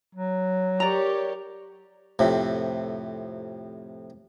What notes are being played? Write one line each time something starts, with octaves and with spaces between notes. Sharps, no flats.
F#3
G4 A#4 C#5 D5 A#5
F2 A2 C3